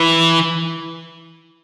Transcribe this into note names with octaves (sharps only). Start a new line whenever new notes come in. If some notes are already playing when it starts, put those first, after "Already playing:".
Already playing: E3